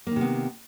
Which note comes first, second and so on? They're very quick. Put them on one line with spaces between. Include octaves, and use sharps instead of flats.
A#3 D#3 C3 B3